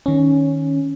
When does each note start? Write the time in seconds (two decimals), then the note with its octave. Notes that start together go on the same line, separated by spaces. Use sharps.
0.06 D#3 C#4